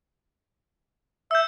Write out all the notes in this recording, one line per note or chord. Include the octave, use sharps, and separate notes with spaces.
E5 E6 G6